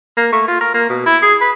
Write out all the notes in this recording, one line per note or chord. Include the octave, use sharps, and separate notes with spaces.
A#3
A3
F4
A#4
A#3
B2
E4
G#4
B4